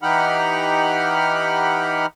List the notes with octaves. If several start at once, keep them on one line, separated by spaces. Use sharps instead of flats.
E3 D#4 G4 F#5 B5 F6